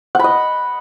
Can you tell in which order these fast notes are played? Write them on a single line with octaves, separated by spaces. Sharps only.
F#5 B5 D#5